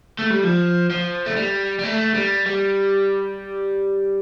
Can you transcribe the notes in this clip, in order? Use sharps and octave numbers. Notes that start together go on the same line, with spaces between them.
A3
G3
F3
F3
A3
G3
G3
A3
G3
G3